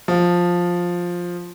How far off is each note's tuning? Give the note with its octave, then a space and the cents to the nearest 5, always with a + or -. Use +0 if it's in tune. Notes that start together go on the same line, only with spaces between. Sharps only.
F3 +10